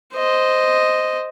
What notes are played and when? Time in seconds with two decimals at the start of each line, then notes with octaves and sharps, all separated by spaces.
0.15 C5 D#5